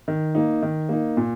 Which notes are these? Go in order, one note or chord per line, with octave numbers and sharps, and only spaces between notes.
D#3
A#3 D#4
D#3
A#3 D#4
A#2